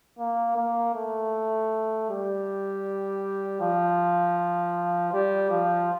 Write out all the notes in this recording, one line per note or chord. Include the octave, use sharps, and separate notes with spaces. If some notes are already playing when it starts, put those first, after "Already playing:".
A#3
A#3
A3
G3
F3
G3
F3